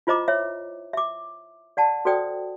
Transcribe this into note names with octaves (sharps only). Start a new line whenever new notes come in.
E4 F4 C5 D#5 A#5 D6
C#5 E5
E5 D6
D5 F#5 A5
F#4 A4 C5 D5 G5 D#6